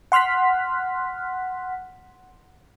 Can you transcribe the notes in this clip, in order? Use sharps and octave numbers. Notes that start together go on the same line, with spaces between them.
F#5 C6 F6 F#6 B6